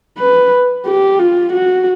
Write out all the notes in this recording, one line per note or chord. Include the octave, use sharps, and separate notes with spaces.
B4
G4
F4
F#4